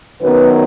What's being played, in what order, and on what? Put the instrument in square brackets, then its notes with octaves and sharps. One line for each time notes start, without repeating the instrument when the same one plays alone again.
[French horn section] F#2 D#3 F#3 B3 B4